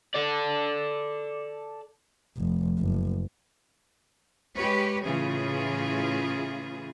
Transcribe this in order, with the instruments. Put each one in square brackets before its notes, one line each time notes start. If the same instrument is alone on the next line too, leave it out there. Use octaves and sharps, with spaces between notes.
[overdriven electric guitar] A4 D5
[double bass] F1
F#1
[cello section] G#3 G4 B4 C#5
A2 C#3 E3 F4 G#4